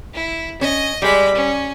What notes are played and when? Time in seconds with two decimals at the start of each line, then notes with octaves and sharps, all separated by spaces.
0.14 E4
0.61 C#4 D#5
1.02 G3 G#3 B5
1.35 C#4